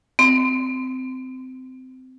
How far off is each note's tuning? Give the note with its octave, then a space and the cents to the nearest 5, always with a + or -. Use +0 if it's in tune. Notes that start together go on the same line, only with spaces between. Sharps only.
C4 -20